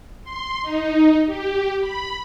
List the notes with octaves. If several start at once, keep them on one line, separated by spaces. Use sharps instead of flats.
C6
D#4
G4
B5